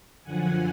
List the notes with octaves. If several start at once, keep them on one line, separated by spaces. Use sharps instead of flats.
F#2 D3 F3 F#5 G#5